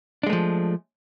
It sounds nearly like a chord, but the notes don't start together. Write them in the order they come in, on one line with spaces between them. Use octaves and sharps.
D4 G#3 A3 F3